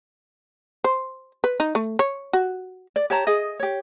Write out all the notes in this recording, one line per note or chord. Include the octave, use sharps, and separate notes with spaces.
C5
B4
D#4
A3
C#5
F#4
D5
G4 C#5 A5 A#5
G#4 D#5
G4 C#5